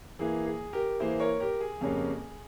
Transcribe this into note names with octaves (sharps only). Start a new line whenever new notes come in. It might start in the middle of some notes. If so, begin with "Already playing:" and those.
E3 A#3 E4 G#4
G#4
G4 A#4
E3 A#3 E4 G#4 C5
A#4 C#5
G4 A#4
G#4
F2 C#3 G3 A#3 C#4